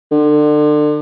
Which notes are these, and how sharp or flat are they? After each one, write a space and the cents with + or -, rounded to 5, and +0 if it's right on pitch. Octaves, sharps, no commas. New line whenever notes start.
D3 +30